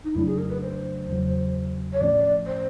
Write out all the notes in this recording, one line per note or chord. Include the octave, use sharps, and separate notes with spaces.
D#4
F2 C#3 F#3 A3 D4 E4
G#4
A#4
B4
C5
E2 C#3 F#3
C#5
A2 F3 A3 C#4 D5
C5